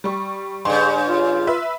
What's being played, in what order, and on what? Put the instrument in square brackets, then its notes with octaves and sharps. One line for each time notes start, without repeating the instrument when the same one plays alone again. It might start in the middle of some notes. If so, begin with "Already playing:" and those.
[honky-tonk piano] G3 C#6
[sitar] G2 C#3 [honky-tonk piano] C6
[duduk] F4
[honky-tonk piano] B4 E5